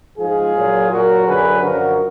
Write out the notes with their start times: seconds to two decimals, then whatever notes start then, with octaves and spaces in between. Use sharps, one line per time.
0.18 G#2 F3 F4 G#4
0.55 A#2 F#3
0.90 A#2 F#3 F#4 A#4
1.26 F#2 D3 F#3 G#4 B4
1.62 F#2 D3 F3 F#4 A#4